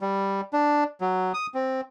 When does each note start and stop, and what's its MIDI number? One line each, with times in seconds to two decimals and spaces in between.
0.01 0.41 55
0.53 0.84 62
1.01 1.33 54
1.34 1.47 87
1.54 1.81 60